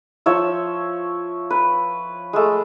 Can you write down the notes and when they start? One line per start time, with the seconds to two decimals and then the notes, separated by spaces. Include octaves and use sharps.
0.26 F3 C#5 E5
1.50 B4
2.33 G#3 A3